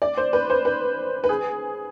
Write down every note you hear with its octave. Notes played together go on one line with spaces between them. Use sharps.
D5
C5
B4
C5
B4
B4
G#4